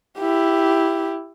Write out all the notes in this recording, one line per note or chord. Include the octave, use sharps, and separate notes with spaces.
E4 G4